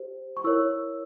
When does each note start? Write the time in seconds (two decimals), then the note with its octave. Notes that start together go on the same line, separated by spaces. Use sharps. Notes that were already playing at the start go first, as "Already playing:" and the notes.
Already playing: G4 C5
0.37 C#6
0.44 E4 A#4 C#5 E6